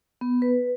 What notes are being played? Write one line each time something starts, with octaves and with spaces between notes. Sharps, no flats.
B3
B4